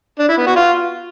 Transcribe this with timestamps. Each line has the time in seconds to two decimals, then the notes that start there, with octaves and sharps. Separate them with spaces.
0.19 D4
0.28 E4
0.38 B3
0.47 F#4
0.56 F4